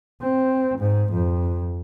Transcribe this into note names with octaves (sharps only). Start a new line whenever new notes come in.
C4
G#2
F2